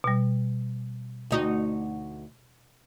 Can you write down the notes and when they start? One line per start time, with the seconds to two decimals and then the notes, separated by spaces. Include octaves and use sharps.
0.04 B2 G3
1.31 D2 D#4 F#4